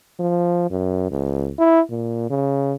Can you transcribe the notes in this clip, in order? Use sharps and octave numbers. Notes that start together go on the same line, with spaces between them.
F3
F#2
C#2
E4
A#2
C#3